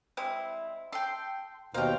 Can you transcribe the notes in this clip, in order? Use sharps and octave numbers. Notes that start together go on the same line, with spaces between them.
G3 G#3 C4 E4
A4 G5 C6
D#2 B2 A#3 C5 F5 G5